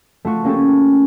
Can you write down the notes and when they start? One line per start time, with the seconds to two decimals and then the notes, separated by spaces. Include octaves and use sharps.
0.25 A3 F4 F#4
0.44 A#3 C#4 G4 A4